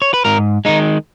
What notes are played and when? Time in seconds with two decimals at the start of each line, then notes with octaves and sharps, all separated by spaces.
0.02 C#5
0.14 B4
0.25 G#2 A#4
0.65 D#3 G#3 D#4